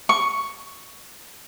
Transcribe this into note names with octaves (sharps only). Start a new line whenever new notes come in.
C#6